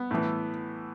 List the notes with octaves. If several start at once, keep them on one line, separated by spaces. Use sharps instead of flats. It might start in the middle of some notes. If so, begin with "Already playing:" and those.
Already playing: B3
A2 E3